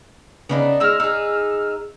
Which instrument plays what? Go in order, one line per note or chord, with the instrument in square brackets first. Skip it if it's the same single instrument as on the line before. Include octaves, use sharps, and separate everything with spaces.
[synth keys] C#3 [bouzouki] B3 D4 D#4
[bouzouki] G#3 D#4 [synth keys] E6 F6
[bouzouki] D#4 G#4